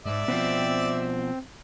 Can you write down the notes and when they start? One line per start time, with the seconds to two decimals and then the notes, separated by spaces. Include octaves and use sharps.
0.06 G#2 D5 E5
0.28 B2 D#3 F3 C4